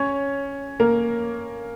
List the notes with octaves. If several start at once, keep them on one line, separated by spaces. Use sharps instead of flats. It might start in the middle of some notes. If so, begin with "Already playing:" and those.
Already playing: C#4 C#5
A#3 A#4